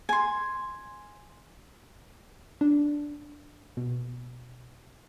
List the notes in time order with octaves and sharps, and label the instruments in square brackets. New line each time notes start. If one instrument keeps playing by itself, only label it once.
[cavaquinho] G#5 C6
[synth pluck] D4
B2